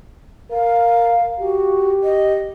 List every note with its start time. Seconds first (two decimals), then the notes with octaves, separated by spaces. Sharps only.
0.51 A#4 F5
1.40 F#4 G4
2.03 D#5